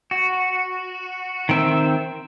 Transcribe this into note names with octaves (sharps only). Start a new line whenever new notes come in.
F#4
D#3 C4 E5